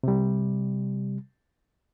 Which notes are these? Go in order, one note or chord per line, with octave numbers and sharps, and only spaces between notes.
C3 G3